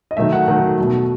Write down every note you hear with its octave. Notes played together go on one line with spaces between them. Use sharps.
D#5
D#3 F#3 A3 E5
F#5
D#3 F#3 A3 F#5
B2 F#3 A3